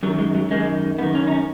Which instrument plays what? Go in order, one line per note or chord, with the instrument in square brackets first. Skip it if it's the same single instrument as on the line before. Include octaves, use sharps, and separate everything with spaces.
[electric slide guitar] F#2 F#3
D#3
G#3
F#3
F#2 D#3 G#3
F#2 D#3 B3
C#4
D#4
C#4